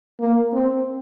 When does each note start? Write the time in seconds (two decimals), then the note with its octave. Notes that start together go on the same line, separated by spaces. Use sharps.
0.20 A#3
0.53 C4